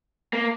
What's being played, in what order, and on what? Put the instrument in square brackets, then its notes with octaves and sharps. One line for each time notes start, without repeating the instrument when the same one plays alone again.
[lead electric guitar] A#3